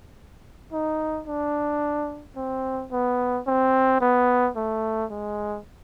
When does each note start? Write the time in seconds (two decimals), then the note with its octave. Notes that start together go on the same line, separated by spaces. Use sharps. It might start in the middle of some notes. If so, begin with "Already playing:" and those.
0.73 D#4
1.27 D4
2.36 C4
2.92 B3
3.47 C4
4.01 B3
4.56 A3
5.10 G#3